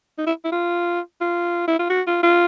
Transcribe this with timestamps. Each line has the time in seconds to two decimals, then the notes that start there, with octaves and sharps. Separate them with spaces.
0.18 D#4
0.27 E4
0.45 E4
0.52 F4
1.21 F4
1.68 E4
1.79 F4
1.90 F#4
2.07 F4
2.23 F4